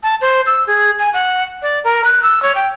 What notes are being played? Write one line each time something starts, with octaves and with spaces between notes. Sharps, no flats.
A5
C5
E6
G#4
G#5
F#5
D5
A#4
F#6
E6
C#5
G5